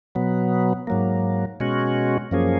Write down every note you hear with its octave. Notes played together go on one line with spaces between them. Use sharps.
B2 F#3 B3
G#2 F#3 A#3
B2 G#3 C#4 F#4
F#2 F3 A#3 C#4 G#4